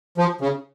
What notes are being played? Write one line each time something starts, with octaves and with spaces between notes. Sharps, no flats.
F3
C#3